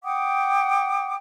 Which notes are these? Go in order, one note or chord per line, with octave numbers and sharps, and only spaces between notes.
F#5 G5 D6 D#6